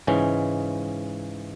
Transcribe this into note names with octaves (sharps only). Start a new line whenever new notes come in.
G#2 C#3 E3 G#3 C#4